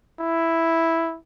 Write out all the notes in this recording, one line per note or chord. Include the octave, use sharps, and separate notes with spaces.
E4